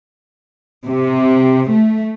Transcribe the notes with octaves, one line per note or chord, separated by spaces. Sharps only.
C3
A3